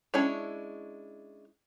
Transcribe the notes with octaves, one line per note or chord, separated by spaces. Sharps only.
G#3 C#4 D4 E4 C#5